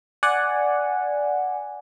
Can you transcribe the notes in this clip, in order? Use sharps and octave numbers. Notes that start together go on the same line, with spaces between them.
D5 F#5 G#5